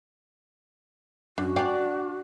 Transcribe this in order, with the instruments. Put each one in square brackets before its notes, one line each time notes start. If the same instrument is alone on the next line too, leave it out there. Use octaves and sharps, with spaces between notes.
[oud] F#2 [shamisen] D4 [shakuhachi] F#4
[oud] D4 D5 [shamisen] F5 G5 G#5